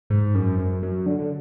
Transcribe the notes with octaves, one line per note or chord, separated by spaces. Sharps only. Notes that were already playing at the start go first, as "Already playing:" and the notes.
G#2
F#2
F#2
F#2
D3
D3